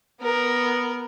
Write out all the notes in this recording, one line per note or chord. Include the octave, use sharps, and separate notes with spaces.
B3 A#4